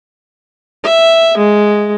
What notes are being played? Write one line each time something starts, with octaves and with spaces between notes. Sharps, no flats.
E5
G#3